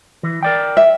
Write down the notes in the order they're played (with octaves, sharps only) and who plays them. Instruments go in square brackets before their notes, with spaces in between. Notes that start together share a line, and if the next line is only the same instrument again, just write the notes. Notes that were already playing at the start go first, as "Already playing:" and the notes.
[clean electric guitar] E3
A#4 D5 G5
[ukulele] E5